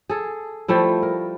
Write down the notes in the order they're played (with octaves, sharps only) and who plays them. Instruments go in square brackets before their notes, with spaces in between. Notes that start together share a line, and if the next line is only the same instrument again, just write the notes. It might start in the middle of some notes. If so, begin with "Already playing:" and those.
[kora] G#4 A4
F3 G3 A3 E4
A#4